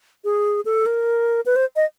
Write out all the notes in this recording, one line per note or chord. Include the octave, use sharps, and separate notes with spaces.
G#4
A4
A#4
B4
C5
D#5